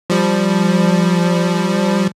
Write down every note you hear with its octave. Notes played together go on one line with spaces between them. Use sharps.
F3 G3